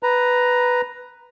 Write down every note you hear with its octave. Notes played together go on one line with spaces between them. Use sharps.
B4 A#5